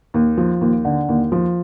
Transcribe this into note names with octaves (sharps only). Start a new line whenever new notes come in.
D#2
F3
D#2
D3
D#2
F3